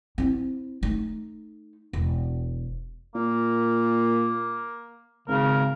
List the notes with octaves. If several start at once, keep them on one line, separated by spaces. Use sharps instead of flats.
C4 E4
A3 D#4
E1
A#2 A#3
G#1 C#3 A#4